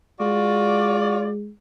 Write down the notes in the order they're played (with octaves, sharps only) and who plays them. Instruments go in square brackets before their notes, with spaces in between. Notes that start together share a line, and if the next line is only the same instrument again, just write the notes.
[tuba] G#3 [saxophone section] F4 F#4 D5